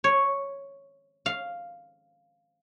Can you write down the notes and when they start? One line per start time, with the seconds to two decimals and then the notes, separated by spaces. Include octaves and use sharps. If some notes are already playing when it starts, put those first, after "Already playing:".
0.04 C#5
1.26 F5